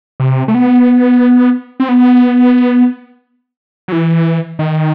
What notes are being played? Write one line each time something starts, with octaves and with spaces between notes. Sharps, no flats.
C3
A3
B3
C4
B3
F#3
E3
D#3